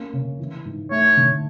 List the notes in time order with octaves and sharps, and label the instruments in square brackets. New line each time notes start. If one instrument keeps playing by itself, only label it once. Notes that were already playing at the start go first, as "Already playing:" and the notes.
Already playing: [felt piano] A#3 C#4
C#3
E3
G#2
[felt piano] A3 [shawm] C#5
[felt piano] D3